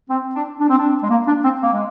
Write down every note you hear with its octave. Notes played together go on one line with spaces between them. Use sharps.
C4
D4
D4
C4
D4
G#3
A#3
D4
C4
A#3
G#3